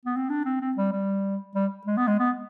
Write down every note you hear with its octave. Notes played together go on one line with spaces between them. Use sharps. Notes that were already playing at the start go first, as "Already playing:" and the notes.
B3
C4
D4
C4
C4
G3
G3
G3
G#3
B3
G#3
B3